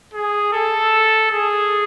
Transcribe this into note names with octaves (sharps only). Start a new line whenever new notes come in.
G#4
A4
G#4